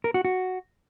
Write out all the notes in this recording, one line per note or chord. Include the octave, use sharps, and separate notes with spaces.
A#4
F#4
F#4